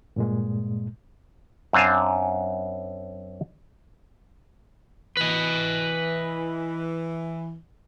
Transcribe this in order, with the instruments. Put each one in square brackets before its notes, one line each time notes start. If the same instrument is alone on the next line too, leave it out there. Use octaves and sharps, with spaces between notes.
[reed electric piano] G2 A#2 G#3
[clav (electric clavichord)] F#2 C4 D4 F5 G#5 A5
[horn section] E3 [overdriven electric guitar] B4 D#5